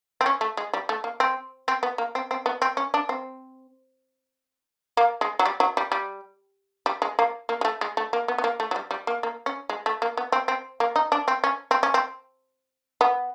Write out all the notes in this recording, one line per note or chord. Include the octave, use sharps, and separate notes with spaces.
C4
C#4
A3
G#3
G3
A3
A#3
C4
C4
B3
A#3
C4
C4
B3
C4
C#4
D4
C4
A#3
G#3
F#3
G3
F#3
G3
G3
G3
G#3
A#3
A#3
G#3
A3
G#3
A3
A#3
B3
B3
A#3
A3
F#3
G3
G3
A#3
A#3
C#4
G#3
A3
A#3
B3
C4
C4
A#3
D#4
D4
C4
C#4
C4
C#4
C4
B3